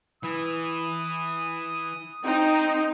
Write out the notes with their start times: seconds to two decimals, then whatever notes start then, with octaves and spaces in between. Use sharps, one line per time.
0.23 E3 D#6
2.25 C4 D#4